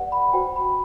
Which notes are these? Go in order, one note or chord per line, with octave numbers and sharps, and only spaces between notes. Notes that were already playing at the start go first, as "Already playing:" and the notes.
Already playing: G4 B4 D5 F#5
B5
F#4 C5 G5
B5